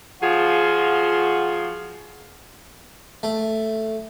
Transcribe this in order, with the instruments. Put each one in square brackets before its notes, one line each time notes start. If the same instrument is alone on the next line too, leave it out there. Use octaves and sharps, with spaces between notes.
[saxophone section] F3 F4 F#4 G#4
[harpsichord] A3